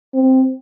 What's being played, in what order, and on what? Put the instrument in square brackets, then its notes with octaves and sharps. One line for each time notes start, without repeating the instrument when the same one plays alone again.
[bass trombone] C4